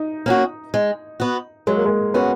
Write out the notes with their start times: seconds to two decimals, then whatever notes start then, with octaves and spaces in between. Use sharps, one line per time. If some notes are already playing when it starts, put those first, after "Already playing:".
Already playing: D#4
0.26 A#3 C#4 F#4
0.74 G#3
1.20 B3 F#4
1.67 F#3 G#3
1.76 A#3
1.85 G#3
2.14 B3 C#4 F#4